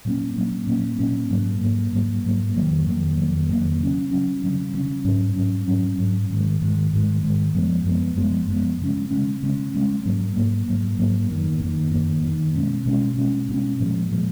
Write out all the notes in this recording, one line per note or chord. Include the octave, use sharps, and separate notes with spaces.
A#2 F#3 A#3 C#4
A#2 F#3 A#3 C#4
A#2 F#3 A#3 C#4
A#2 F#3 A#3 C#4
G#2 F#3 A#3
G#2 F#3 A#3
G#2 F#3 A#3
G#2 F#3 A#3
F2 D#3 F#3 A#3
F2 D#3 F#3 A#3
F2 D#3 F#3 A#3
F2 D#3 F#3 A#3
C#3 F#3 C#4
C#3 F#3 C#4
C#3 F#3 C#4
C#3 F#3 C#4
G#2 F#3 C#4
G#2 F#3 C#4
G#2 F#3 C#4
G#2 F#3 C#4
G#2 D#3 G#3
G#2 D#3 G#3
G#2 D#3 G#3
G#2 D#3 G#3
F#2 F3 G#3 B3
F#2 F3 G#3 B3
F#2 F3 G#3 B3
F#2 F3 G#3 B3
C#3 G#3 C#4
C#3 G#3 C#4
C#3 G#3 C#4
C#3 G#3 C#4
G#2 F#3 A#3
G#2 F#3 A#3
G#2 F#3 A#3
G#2 F#3 A#3
F#2 D#3 A#3
F#2 D#3 A#3
F#2 D#3 A#3
F#2 D#3 A#3
B2 G#3 C#4
B2 G#3 C#4
B2 G#3 C#4
B2 G#3 C#4
A#2 F3 G#3
A#2 F3 G#3